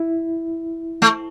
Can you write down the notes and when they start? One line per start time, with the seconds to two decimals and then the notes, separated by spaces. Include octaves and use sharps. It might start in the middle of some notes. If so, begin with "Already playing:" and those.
Already playing: E4
1.02 A3